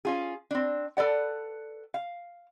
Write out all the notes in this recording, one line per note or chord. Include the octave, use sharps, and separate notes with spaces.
C#4 F4 G#4
C4 D4
A4 B4 D5 F#5
F5